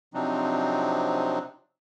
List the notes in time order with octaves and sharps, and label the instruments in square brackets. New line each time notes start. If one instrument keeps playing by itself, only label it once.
[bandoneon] C3 F3 F#3 C4 D4 D#4